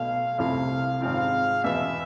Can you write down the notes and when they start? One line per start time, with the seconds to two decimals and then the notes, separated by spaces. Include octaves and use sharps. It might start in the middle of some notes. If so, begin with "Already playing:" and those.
Already playing: B1 B2 A3 F5
0.38 C2 C3 F3 A3 E4 F5
1.01 G#1 G#2 G#3 C4 F4 F5
1.63 E2 B2 B3 E5